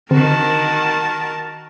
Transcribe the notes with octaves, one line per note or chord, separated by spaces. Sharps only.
D3 D#3 C4 F#4 A#4 A5